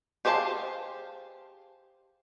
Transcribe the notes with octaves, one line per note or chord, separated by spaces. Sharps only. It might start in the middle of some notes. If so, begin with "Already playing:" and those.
G4 G#4 C5 F5 A5